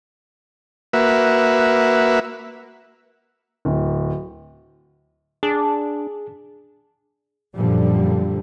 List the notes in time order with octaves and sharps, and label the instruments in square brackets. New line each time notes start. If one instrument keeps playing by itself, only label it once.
[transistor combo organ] A#3 F#4 B4 E5
[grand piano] D1
[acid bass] D4 [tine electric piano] G#4
[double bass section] F#2 A#2 D3 F3 G3